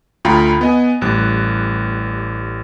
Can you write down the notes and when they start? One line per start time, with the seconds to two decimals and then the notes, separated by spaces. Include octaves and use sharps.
0.25 D2 F4 G5 A#5 B5
0.61 B3 D#5 G#5
1.01 A1 G3 F#6